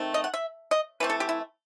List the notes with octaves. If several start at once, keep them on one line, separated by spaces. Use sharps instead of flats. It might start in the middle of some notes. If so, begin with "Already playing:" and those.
Already playing: D#3 A3 C4
D#5
F#5
E5
D#5
E3 A3 C4 B4
A4
G4
E4